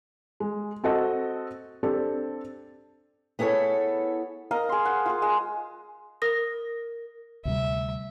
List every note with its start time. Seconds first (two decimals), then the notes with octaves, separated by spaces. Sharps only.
0.40 G#3
0.84 C4 F#4 A4 D#5
1.83 C4 D4 G4 A4
3.39 B3 E4 G#4 A4 C#5
4.51 A#4 D#5 F5 A#5
4.69 G#4 C6
4.85 F#5
5.06 F4 G#4
5.22 G#3
6.22 A#4 D#6 A#6
7.45 D2 C3 G3 E5